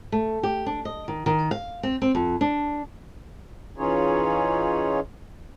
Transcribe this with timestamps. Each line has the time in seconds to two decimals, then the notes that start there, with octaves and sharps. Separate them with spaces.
0.12 A3
0.43 G4
0.66 D4
0.85 D#5
1.08 D#3
1.26 D#3
1.51 F5
1.83 C4
2.02 C4
2.15 F2
2.41 D4
3.78 E3 C#4 D#4 F4 G#4 C#5